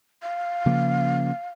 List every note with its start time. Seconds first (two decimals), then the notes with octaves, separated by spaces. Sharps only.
0.23 F5
0.66 C#3 F3 A#3